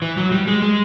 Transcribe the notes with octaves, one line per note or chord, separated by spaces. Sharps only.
E3
F#3
G3
G#3
G#3